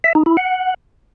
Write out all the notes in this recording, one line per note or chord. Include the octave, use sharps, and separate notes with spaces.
E5
D#4
E4
F#5